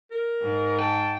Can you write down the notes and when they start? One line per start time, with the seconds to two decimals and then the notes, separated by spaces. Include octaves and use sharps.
0.11 A#4
0.41 G#2
0.79 G5 A5